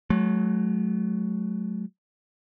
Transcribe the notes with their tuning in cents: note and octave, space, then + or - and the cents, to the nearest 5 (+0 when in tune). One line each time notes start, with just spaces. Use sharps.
F#3 +0 A3 -40